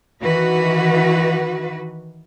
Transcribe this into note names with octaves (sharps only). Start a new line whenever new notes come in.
D#3 E3 F#4 B4